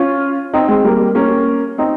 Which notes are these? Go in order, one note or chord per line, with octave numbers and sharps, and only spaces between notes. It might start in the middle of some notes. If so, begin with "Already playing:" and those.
Already playing: C#4 F4
C4 D#4
G#3 C4
G3 A#3
A#3 C#4
C4 D#4